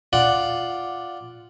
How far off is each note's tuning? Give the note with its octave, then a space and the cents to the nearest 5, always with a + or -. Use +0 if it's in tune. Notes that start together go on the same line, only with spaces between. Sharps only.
F4 +0 D5 +0 F#5 +0